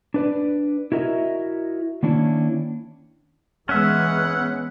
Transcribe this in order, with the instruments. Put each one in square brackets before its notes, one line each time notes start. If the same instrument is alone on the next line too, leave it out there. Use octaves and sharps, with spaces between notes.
[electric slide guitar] D4 B4 D5
E4 F#4 A#4 D#5 E5
D#3 A#3 C#4 D4 E4
[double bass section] E3 G#3 B3 [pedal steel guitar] C#4 E5 [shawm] F#5